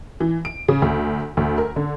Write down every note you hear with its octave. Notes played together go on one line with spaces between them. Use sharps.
E3
D7
C#3
D2
D2
A#4
D3